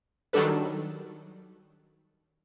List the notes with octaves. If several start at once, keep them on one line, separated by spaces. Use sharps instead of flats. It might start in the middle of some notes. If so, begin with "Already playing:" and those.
D#3 F#3 G3 D4 A4 B4